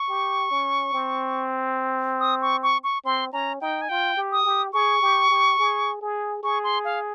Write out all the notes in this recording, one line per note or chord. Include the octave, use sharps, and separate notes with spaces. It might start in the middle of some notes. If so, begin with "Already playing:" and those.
Already playing: C#6
G4
C#4
C4
D#6
C#6
C#6
C#6
C4 C6
C#4 A#5
D#4 G5
G#5
F4 G5
G4
D#6
G4
G#4 C#6
G4
G4
G#4
G#4
G#4 C#6
C6
F5